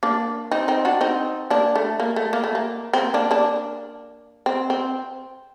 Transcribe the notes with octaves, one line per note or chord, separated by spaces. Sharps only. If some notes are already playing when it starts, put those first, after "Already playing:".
A#3 D4
C4 D#4
C4 D#4
D4 F#4
C4 D#4
A#3 D4
A3
A#3
A3
A#3
A3
A#3
C4
A#3
A#3 D4
A#3 D4
C4
C4